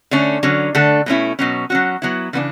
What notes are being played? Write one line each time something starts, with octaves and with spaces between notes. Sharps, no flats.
D3 A3 C#4
D3 F#3 C#4
D3 A3 D4 A4
B2 A3 C#4 E4
B2 F#3 C#4
F#3 C#4 F#4
F#3 B3 E4
C#3 E3 B3 D4